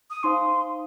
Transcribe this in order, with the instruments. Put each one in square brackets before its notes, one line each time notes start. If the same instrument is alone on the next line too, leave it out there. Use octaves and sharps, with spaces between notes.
[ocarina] D#6
[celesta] D#4 C5 F5 [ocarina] C6